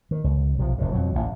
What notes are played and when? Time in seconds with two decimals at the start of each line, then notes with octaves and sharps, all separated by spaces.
0.11 D#3
0.24 C#2
0.58 B1 C3 E3 F3
0.78 F1 D#2 A2
0.92 F2 B2 F#3
1.14 A1 D2